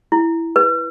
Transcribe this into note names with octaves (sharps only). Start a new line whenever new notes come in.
E4
B4